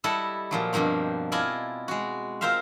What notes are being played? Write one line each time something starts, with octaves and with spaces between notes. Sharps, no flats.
G3 E4 A4 D#5 F#5 A5
A#2 F3 F#3
G2 B2 F3 A#3 C4
E4 F4 D5 D#5 G#5 A5
G#3 F#4
C4 F4 A#4 C5 E5 F5